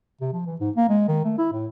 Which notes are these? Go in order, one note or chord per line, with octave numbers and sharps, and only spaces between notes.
C3
F3
E3
G#2
A#3
G#3
D#3
A3
E4
A2